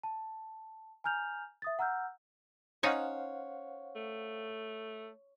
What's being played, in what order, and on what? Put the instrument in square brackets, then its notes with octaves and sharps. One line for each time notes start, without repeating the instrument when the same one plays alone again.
[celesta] A5
G#5 A#5 F6 G6 F7
E5 D#6 A6
F#5 A#5 E6 F6 G6
[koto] C#4 D#4 [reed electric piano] C5 F5 F#5 [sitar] C#5
[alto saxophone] A3